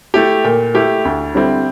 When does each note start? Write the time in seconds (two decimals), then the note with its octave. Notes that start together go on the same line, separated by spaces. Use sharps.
0.14 A3 E4 G4
0.44 A#2
0.74 A3 E4 G4
1.05 D2
1.35 D3 G3 C4 E4